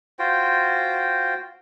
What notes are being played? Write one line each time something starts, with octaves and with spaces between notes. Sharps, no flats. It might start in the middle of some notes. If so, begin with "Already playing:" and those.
F4 F#4 C5 G5